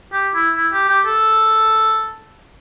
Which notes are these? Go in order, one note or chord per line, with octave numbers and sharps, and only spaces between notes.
G4
E4
E4
G4
G4
A4